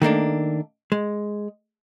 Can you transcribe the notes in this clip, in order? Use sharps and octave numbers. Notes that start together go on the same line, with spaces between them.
D#3 A3 A#3 D4
G#3